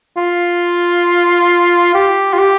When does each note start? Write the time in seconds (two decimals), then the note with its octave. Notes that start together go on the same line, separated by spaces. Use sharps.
0.17 F4
1.95 G4
2.34 F4
2.39 G4